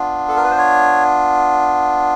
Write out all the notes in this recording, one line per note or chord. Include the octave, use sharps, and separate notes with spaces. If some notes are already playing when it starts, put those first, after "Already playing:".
Already playing: B3 D4 F4
A4
A#4
B4
C5
C#5